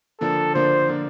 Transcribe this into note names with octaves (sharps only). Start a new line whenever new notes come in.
D3 F3 A#3 D4 A4
D3 F3 A#3 D4 C5
D3 F3 A#3 D4